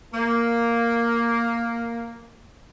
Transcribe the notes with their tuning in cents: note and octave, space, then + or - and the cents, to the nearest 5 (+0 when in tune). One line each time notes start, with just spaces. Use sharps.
A#3 +0